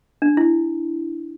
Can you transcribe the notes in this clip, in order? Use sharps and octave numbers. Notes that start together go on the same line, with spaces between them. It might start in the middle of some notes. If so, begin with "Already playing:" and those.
D4
E4